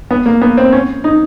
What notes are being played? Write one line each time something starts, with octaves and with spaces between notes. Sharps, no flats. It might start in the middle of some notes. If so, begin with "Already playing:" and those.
B3
A#3
B3
C4
C#4
D#4